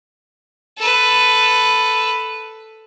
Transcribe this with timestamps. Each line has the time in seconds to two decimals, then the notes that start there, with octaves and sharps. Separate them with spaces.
0.78 A4 B4